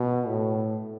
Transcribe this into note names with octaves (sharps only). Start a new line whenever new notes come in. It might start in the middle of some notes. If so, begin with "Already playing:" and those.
Already playing: B2
A2